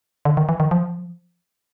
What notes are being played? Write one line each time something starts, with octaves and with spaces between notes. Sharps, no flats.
D3
D#3
E3
D#3
F3